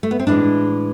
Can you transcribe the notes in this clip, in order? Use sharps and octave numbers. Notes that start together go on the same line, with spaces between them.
A3
B3
C4
A2 E3 G#3 D4